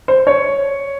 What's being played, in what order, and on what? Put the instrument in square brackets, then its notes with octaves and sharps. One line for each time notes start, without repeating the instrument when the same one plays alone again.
[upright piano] C5
C#5